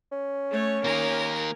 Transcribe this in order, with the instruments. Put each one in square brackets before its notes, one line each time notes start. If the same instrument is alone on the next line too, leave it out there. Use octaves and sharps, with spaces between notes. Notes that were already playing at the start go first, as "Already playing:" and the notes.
[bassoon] C#4
[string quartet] A3 C#5
[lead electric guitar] D#3 A#3 [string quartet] A#4 G#5 A#6